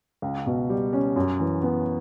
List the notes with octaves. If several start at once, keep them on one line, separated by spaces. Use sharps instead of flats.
C#2
B2
G3
C#4
F#2
E3
B3